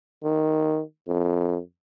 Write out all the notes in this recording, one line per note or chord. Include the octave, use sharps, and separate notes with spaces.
D#3
F2